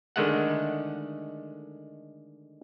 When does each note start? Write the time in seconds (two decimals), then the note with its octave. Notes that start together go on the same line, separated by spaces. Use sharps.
0.16 D3 D#3 G#3 A3 F#5